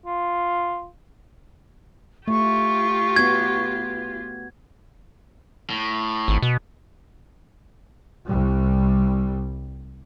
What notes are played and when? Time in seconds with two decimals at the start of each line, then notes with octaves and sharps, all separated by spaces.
0.06 F4
2.28 A3 F4 G4 C#6
3.16 B3 F#4 G#6
5.70 A2
6.28 G#1
6.42 B2
8.25 C2 G3